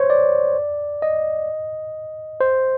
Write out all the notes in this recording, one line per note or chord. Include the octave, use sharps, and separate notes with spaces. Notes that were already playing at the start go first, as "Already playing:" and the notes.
Already playing: C5 C#5
D5
D#5
C5